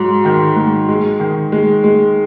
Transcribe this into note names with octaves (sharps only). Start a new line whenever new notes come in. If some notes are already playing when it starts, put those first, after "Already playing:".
Already playing: G#2 F#3
D#3
G#2
G#3
D#3
G#3
G#3